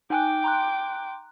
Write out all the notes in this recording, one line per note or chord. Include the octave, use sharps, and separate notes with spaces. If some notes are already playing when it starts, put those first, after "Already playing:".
D#4 G5 G#5 D6 F#6
A#5 C6 F#6